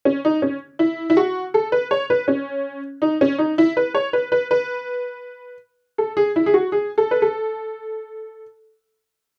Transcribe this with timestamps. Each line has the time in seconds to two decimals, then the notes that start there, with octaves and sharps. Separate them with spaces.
0.05 C#4
0.25 D#4
0.42 C#4
0.79 E4
1.10 E4
1.17 F#4
1.54 A4
1.72 B4
1.91 C#5
2.10 B4
2.28 C#4
3.02 D#4
3.21 C#4
3.38 D#4
3.58 E4
3.77 B4
3.95 C#5
4.13 B4
4.32 B4
4.51 B4
5.98 A4
6.17 G#4
6.36 E4
6.46 G#4
6.54 F#4
6.72 G#4
6.98 A4
7.11 B4
7.22 A4